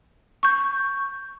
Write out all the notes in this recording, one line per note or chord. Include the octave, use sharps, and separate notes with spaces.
C#6 G6